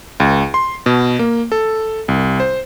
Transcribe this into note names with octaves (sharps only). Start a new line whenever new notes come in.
C#2
C6
B2
A#3
A4
C2
C5